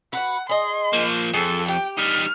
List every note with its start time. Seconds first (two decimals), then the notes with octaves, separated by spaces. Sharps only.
0.13 F#4 B4 F#5
0.49 G#4 D#5 C6
0.93 F3 A#3
1.34 F2 G#4 A4
1.68 G4 G5
1.98 G3 D#4 F6